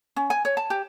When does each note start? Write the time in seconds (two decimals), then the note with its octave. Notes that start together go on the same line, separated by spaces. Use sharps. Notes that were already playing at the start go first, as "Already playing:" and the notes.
0.16 C#4
0.30 G#5
0.45 C#5
0.57 A5
0.70 G4